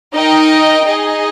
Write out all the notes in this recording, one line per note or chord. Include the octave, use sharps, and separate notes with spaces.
D#4 A#4 D#5 G5
D#4 G#4 D#5